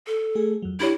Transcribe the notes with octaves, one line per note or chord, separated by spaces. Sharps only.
A4
A3 G#4
F2 F#3
D4 E4 G4 C#5